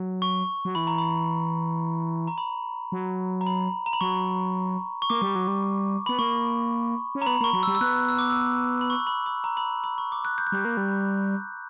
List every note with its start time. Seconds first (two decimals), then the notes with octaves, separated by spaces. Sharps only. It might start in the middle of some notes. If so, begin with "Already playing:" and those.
Already playing: F#3
0.22 C#6
0.65 F#3
0.75 E3 B5
0.87 A#5
0.98 B5
2.27 A#5
2.38 B5
2.92 F#3
3.41 A#5
3.47 B5
3.86 A#5
3.93 B5
4.01 F#3 C#6
5.02 C#6
5.10 A#3 D6
5.22 G3
5.35 F#3
5.48 G3
6.06 B3 B5
6.19 A#3 C#6
7.15 C#4
7.22 A#5
7.26 B3 B5
7.41 A#3 C#6
7.53 F#3
7.63 E6
7.67 G3
7.75 E6
7.81 B3 F#6
8.09 E6
8.19 D6
8.30 E6
8.81 B5
8.90 C#6
9.07 B5
9.26 B5
9.44 A#5
9.57 B5
9.84 B5
9.98 C#6
10.12 D6
10.25 F#6
10.38 G6
10.47 F#6
10.52 G3 G6
10.65 A#3
10.77 G3